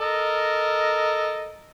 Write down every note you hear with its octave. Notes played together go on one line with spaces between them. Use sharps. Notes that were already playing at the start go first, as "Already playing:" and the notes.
A4 A#4 D#5